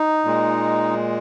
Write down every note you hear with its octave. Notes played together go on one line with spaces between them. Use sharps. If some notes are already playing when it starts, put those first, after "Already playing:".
Already playing: D#4
A#2 G#3